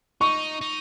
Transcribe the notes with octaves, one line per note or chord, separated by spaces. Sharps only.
D#4 C#6
D#4